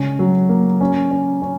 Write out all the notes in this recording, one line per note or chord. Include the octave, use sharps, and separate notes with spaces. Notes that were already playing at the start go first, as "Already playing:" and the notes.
Already playing: C#3 G#3 C#4
F#3
A#3
C#4
C#4
C#4